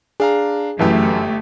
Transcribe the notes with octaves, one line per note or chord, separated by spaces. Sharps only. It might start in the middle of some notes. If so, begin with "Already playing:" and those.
D4 G#4 F5 A#5
G1 F#2 E3 A3 G4